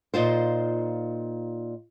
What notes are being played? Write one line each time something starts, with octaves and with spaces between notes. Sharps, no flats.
A#2 D#4 F4 C5